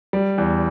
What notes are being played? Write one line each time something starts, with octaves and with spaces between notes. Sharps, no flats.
G3
E2